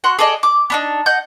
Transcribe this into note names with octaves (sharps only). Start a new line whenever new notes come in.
F#4 F#5 C6
G#4 A4 D5 D#5
D6
B3 D4 D#4
D#5 F#5 G6